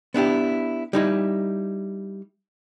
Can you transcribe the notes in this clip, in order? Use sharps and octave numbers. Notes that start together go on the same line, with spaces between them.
B3 D4 E4 G4
G3 D#4 E4